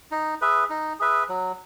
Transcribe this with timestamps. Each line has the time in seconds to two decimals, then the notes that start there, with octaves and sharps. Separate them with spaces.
0.11 D#4
0.41 G#4 B4 E5
0.70 D#4
0.99 G#4 B4 E5
1.29 F#3